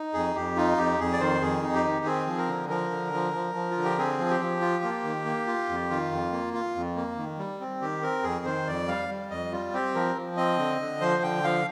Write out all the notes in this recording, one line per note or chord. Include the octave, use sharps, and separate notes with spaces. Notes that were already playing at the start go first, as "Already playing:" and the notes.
Already playing: D#4
F2 G#4
F2 G4
D#4 F4
F2 G4
F2 G#4
D5
D#3 C5
F2 G#4
D#4
G4
D#3
C4 G#4
F3
A#4
D3
F3 A#4
D3
F3
F3
F3
F4
D3
G4
C4 G#4
F3
G4
F3
F4
A#3
D#3
A#3
F4
F2
D#3 F4
F2
A#3
F4
F2
A#3
D#3
G3
C4
D#3 G4
C4 A#4
F2 G#4
D#3 C5
F2 D5
G3 F5
G3
F2 D#5
G3 F4
C4 G4
F3 A#4
F3
C4 D#5
D3
D3
F3 C5
D3 G5
F3 F5